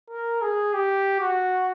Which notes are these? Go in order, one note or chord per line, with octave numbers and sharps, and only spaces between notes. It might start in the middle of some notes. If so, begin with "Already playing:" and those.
A#4
G#4
G4
F#4